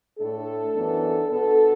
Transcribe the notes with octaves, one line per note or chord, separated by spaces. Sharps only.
A2 A3 D4 A4
F#2 E3 B3 D4
B2 B3 D4 A4